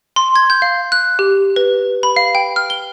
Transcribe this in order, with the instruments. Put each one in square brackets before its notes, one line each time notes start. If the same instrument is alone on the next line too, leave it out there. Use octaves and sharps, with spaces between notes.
[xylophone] C6
G#6
G6
F5
F#6
G4
B4
B5
F5
G5
F6
G7